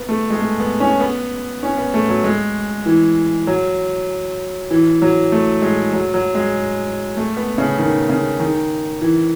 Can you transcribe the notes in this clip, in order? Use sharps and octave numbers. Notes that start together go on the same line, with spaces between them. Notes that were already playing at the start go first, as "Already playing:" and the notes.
Already playing: B3
A3
G#3
A3
B3
C#4
B3
C#4
B3
A3
F#3
G#3
E3
F#3
E3
F#3
A3
G#3
F#3
F#3
G#3
A3
B3
C#3
D#3
C#3
D#3
E3